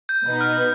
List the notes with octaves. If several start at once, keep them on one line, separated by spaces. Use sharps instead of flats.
G6
B2 B3 D#4 B4
F6